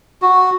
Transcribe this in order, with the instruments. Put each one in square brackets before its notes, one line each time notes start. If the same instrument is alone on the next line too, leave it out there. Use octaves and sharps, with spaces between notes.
[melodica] F#4